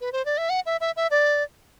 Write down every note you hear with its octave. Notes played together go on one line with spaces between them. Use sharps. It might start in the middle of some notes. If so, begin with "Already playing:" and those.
B4
C5
D5
E5
F#5
E5
E5
E5
D5